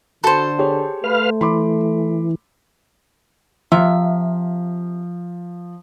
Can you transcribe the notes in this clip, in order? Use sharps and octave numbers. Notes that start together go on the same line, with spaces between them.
D3 F#4 A4 C5
G4 G#4 C#5
A3 B4 F5 F6
E3 B5 C6 D6
C3 F3 F4 E5